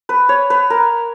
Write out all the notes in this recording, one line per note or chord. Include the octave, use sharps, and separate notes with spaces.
B4
C#5
B4
A#4